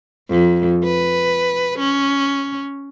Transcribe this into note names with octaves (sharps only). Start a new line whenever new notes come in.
F2
B4
C#4